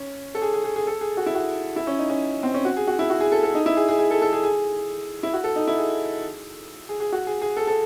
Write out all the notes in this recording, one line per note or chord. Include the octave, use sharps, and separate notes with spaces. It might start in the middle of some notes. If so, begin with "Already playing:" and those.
Already playing: C#4
A4
G#4
G#4
G#4
G#4
A4
G#4
F#4
E4
F#4
E4
C#4
D#4
C#4
C4
C#4
F#4
G#4
F#4
E4
F#4
G#4
A4
A4
D#4
E4
G#4
G#4
G#4
A4
A4
G#4
G#4
E4
F#4
A4
D#4
E4
G#4
G#4
G#4
F#4
G#4
G#4
A4
A4